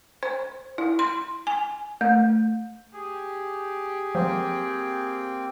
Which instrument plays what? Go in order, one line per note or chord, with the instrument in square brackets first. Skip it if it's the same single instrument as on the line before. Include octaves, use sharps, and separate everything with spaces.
[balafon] C5
E4
C6
G#5
A3
[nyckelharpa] G4 [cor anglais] G#4
[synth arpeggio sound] F3 F#3 [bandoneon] A#3 C4 G5